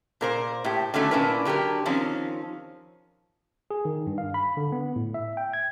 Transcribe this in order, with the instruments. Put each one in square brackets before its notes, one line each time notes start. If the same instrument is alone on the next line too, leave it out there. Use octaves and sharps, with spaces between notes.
[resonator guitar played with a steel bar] A#2 A#4 C5
A2 G4
D3 D#3 F#3 A3 C#4
A#2 C#4 D4 E4 A#4 B4
D3 F#3 G4 A4 A#4
D#3 F3 C4 C#4
[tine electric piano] G#4
D#3
G2
F5
B5
D3
B3
A2
E5
G5
G#6